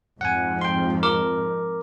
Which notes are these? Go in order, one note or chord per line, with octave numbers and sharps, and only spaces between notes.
F2 G#2 F3 F#5 G#5
G5 C6
A#4 D6